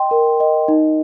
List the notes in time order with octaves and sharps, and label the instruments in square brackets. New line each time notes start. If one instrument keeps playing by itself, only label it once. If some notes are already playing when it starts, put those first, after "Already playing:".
Already playing: [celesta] D#5 G5 C6
A#4
D#5
D#4